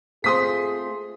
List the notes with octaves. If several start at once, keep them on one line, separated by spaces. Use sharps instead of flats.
A3 C4 F4 G#4 C6 D#6 B6